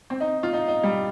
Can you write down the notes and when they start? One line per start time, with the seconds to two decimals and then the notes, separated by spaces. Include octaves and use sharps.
0.10 C4
0.20 D#4
0.43 F4
0.53 D#4
0.68 D#4
0.83 G3